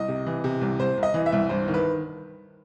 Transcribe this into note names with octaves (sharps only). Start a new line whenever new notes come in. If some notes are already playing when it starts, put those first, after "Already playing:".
Already playing: C2 D#5
C3
E3
C3
C2
C2 C5
C2
D#5
E3
E5
C2
G2 C5
D#3
B4